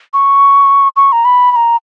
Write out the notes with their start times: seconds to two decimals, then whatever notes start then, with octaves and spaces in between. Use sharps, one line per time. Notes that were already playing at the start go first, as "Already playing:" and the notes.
0.14 C#6
0.96 C#6
1.12 A#5
1.25 B5
1.51 B5
1.56 A#5